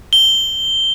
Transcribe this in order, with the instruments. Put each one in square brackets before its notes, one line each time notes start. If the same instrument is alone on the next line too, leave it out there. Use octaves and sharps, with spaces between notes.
[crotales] G7